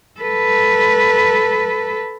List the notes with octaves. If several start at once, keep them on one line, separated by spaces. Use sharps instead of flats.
A4 B4